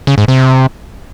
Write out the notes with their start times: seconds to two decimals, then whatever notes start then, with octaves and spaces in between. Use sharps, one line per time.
0.07 C#3
0.18 G#2
0.28 C3